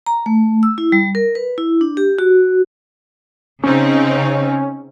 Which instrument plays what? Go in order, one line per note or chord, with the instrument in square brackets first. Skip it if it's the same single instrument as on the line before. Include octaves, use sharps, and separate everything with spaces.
[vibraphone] A#5
A3
E6
E4
G3
A#4
B4
E4
D4
G4
F#4
[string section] C#3 C4 D#4 [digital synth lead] C#4